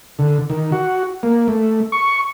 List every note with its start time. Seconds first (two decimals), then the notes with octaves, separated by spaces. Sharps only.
0.19 D3
0.50 D#3
0.72 F#4
1.23 A#3
1.48 A3
1.92 C#6